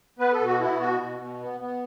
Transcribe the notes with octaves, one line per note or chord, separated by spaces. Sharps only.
B3 B4
A4
B2
F#4
B3 E4
B2 F#4
B2
B2
B3
B3